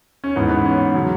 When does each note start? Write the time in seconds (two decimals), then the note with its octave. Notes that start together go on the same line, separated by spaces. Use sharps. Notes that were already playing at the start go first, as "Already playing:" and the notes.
0.24 C#4
0.36 G#2 E3 B3
0.51 B3
0.65 C#4
0.94 C#3 F#3